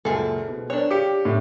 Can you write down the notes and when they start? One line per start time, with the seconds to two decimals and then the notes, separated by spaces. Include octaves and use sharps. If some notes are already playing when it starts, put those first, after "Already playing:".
0.05 C#2 F#2 A#2 F3 G#4 A4
0.49 B2
0.70 D4 A#4 C5 C#5 F#6
0.91 G4 F5 G5 C#7
1.25 A2